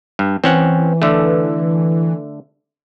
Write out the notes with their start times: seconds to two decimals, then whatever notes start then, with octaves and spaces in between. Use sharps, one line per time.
0.19 G2
0.44 E3 C4 C#4 F#5
1.02 D3 A3